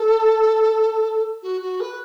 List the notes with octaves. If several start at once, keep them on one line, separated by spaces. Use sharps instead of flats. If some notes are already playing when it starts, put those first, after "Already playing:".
Already playing: A4
F#4
F#4
B4